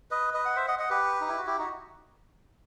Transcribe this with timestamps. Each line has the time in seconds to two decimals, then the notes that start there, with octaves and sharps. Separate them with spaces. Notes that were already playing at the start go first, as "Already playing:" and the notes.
0.11 B4 D#5
0.34 B4 D#5
0.45 F#5
0.56 C5 E5
0.68 D#5 F#5
0.79 D#5 F#5
0.90 G4 B4
1.21 D#4
1.29 E4
1.38 F#4
1.46 E4 G4
1.58 D#4 F#4